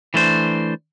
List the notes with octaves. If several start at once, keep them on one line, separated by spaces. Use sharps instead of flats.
E3 A3 D4 C5